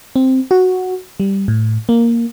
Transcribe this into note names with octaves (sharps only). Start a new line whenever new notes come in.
C4
F#4
G3
A2
A#3